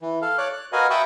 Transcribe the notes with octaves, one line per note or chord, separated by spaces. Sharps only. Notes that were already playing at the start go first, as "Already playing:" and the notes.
E3
A4 F5
C#5 D5 D6 F#6
F#6
F#4 A#4 B4 D#5 F5 G#5
E5 G5 A5 B5 C#6 D#6